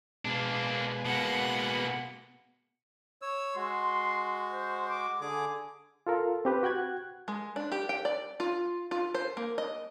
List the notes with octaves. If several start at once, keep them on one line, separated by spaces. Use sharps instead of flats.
B2 G#3 A#3 D4
B2 G#3 A#3 B3 F#5
C#5 E6
G#3 F#4 C6
C5
D6
D3 G#4 G#5 D6
F4 A4 A#4
C4 G4 B4
F#4 G5 F#6 G#6
G#3
D4
G4
G5
D5
F4
F4
C5
A#3
D#5